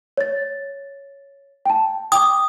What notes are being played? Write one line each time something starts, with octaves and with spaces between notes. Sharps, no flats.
C#5 A6
G5 A5
G5 D6 D#6